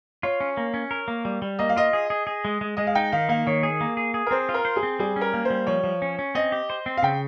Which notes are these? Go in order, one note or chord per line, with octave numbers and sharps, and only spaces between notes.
F4 C#5
C#4
A#3
C#4
A#4
A#3
G3
G3
A#3 D#5
F5
F4 D#5
G#4
G#4
G#4
G#3
G#3
G#3 D#5
F5
D#4 G5
D#3 F5
A#3 F5
D#3 C#5
G#4
A#3
G#4
G#4
A#4
C4 C5
F4
A#4
C5
G#4
C4
G3 G#4
C#4
A#4
A#3
C5
G3
F3 C#5
F3
C#4
C#4
C4 D#5
G4
C5
C4
F5
C#3 G5